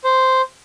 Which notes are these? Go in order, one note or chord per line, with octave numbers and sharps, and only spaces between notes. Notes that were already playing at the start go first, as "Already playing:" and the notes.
C5